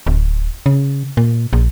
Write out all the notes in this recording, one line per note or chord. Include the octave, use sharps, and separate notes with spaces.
D1
C#3
A#2
A#1